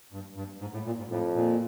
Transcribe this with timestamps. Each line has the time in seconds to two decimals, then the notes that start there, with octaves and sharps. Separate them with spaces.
0.12 G2
0.36 G2
0.61 G#2
0.74 A2
0.86 A#2
0.98 G#2
1.10 F2 A2
1.35 A#2